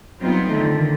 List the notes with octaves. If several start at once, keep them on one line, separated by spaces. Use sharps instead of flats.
F#3 G3 B3 C4 D#4 F4
D3 D#3 A3